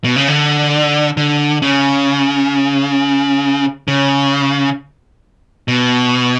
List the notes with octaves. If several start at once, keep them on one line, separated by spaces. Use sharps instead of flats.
B2
C#3
D3
D3
C#3
C#3
B2